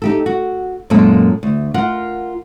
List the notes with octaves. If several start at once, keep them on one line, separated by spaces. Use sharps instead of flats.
D#4 G4 A4
F#4
F#2 A#2 G#3 A#3 A4 A5
D2
F4 A#4 F#5